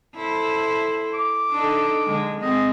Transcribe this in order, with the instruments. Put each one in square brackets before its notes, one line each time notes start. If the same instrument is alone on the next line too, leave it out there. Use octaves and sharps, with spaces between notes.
[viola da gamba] E4 A4 C5
[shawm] D6
[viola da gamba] D4 D#4 A4
D3 G#3
[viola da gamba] G#3 C4 [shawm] D#5